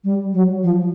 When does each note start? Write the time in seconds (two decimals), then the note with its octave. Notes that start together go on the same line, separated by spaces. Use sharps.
0.04 G3
0.33 F#3
0.63 F3